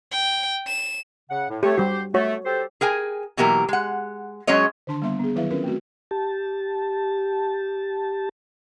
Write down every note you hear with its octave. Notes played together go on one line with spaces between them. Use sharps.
G5
E7
C#3 F#5
A2
A3 G4 C#5
G3 F#4 G4 C5
A3 F#4 C#5
G4 A4 C5
G#4 A#4 G5 G#5
B2 E3 F#3 A#3 G4 A#4
G#3 F#5
F#3 G#3 C#4 C#5 D#5
D3 D#3 D4 A5 C6
G3 A#3 B3 E5 C6
B3 G#4
D#3 F#3 E4 B4 E5 F5
C4 C#4 F4 A#4 B4
A3 C4 F#4
G4 A5